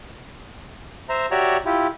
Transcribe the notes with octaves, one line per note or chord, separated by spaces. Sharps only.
C5 E5 A#5
F#4 G4 C#5 D5 E5 A#5
E4 F4 G4